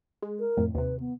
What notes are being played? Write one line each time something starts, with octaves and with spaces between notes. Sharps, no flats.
G#3
A#4
F2 A2
D#2 C3 B4
B3